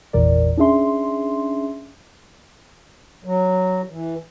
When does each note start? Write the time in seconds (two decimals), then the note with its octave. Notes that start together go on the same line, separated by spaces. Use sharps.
0.13 G#1 E2 A#2 E3 A#4 D5
0.57 C#4 D4 G#4 E5 C6
3.24 F#3
3.89 E3